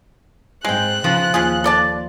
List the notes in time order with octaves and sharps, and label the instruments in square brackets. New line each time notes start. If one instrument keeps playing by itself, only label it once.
[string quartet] G#2 C4 [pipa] G#3 G5 [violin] F#6
[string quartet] C#3 [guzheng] F3
[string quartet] D#2 [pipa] C#4 F4 G#4
[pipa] A4 D5 A5